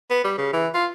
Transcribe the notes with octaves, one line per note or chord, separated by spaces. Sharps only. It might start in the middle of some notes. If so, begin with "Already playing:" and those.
B3
G3
C#3
E3
F4